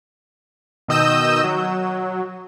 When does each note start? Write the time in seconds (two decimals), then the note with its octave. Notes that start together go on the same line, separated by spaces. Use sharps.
0.88 B2 D#3 D#5 E6 G6 E7
1.44 F#3